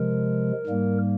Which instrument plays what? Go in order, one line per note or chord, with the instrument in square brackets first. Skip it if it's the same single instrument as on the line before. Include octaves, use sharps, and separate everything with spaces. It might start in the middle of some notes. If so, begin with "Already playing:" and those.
Already playing: [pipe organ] C3 F3 G#3 A#4
G#2 G3 A#3